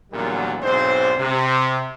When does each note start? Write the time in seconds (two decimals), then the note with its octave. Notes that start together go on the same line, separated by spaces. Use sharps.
0.12 E2 A#2 D3 D#3 F#3 G3
0.62 B1 G#2 C4 D4 C5
1.18 C3